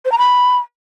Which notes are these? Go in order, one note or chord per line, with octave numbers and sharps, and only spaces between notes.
C5
A#5
B5